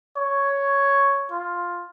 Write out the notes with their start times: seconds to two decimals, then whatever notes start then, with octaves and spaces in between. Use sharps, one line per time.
0.17 C#5
1.32 F4